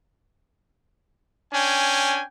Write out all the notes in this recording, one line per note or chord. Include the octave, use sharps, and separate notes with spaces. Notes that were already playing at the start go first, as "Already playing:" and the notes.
C#4 D4 G5 G#5